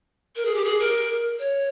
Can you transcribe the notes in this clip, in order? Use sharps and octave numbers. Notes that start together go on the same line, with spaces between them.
A#4
G#4
G4
G#4
A#4
C#5